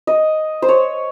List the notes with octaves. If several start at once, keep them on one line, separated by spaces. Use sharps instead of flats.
D#5
C5
C#5